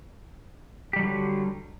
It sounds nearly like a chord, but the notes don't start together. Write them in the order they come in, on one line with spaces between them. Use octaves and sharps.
G4 G3 F#3 D3